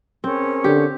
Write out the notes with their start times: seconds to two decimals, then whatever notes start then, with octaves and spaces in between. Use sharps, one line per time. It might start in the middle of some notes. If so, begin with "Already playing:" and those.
0.24 C4 C#4 G#4 A#4
0.64 D3 G4